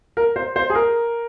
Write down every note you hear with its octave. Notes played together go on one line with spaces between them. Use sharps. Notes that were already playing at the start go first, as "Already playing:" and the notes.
A#4
C5
C5
G#4
A#4